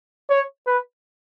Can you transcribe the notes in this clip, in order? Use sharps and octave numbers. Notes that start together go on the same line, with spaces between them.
C#5
B4